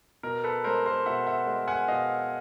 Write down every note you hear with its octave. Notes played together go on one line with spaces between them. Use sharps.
B2 A#4
A4 B4
G#3 A#4 C5
A#4 C5
B2 E5 F#5
E5 F#5
G#3
F#5 G#5
B2 D#5 F5